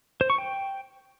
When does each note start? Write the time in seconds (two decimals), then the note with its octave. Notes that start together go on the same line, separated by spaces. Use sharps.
0.21 C5
0.30 C#6
0.38 G5